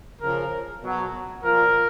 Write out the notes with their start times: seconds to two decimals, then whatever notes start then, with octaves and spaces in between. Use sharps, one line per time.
0.22 C#3 F3 A#4
0.83 B2 F#3
1.43 A#2 F3 A#4